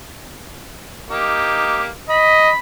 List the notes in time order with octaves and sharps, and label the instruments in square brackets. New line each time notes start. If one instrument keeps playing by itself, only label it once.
[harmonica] A#3 D#4 G4
[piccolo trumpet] D#5 [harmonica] B5